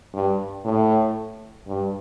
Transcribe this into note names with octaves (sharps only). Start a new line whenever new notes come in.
G2
A2
G2